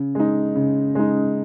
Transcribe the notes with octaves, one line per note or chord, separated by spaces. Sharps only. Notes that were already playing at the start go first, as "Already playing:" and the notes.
Already playing: C#3
G#3 D#4
C#3
G#3 D#4